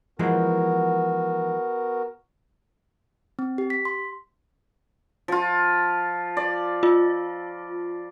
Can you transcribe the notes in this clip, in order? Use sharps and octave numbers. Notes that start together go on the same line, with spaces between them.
E3 F3 G#3 B3 F#4 A#4
C4
G4
B6
C6
F3 F4
D5
F4